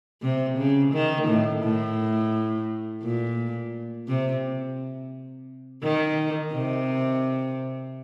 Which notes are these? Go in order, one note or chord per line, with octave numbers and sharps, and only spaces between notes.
C3
C#3
D#3
A2
A2
A#2
C3
D#3
C3